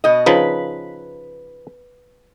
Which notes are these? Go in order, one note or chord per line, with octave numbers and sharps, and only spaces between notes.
B2 D#5
C#3 F3 D#4 B4